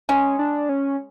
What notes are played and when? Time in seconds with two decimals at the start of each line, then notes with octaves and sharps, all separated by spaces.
0.09 G#3 C#4
0.39 D4
0.69 C#4